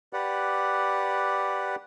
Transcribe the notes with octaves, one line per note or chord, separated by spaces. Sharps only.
G4 B4 D5 F#5